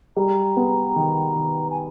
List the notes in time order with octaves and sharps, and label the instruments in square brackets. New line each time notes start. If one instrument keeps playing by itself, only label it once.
[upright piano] G3 [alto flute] A#5
[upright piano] B3
D#3
D#3
[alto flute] G#5